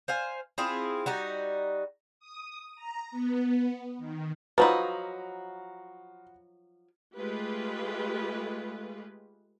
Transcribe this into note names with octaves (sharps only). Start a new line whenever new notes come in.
C5 F5 G#5
C4 E4 F4 G#4
G3 D#4 F#4
D#6
A#5
B3
D#3
F3 F#3 D#4 F4 F#4 B4 A#5 B5
G#3 A3 F4 G4 B4